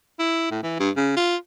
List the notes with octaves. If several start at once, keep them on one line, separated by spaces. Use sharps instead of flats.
E4
A2
E3
G2
C#3
F4